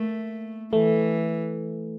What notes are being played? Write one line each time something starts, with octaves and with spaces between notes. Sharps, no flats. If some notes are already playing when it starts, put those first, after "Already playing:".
Already playing: A3 A#3
E3 A3